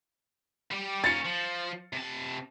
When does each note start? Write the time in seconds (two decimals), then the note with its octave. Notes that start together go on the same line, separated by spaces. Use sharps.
0.71 G3 G4
1.04 A#3 C#4 A6 C#7
1.25 F3
1.93 C3 A5